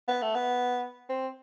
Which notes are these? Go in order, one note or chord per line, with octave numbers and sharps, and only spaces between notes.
B3
A3
B3
C4